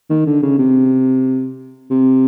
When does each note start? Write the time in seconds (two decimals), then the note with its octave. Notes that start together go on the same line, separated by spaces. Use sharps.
0.10 D#3
0.26 D3
0.43 C#3
0.59 C3
1.91 C3